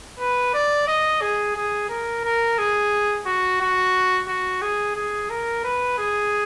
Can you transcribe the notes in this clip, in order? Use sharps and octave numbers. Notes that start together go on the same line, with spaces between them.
B4
D5
D#5
G#4
G#4
A#4
A#4
G#4
F#4
F#4
F#4
G#4
G#4
A#4
B4
G#4